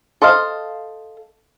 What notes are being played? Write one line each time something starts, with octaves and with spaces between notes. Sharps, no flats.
A4 C5 D#5 F5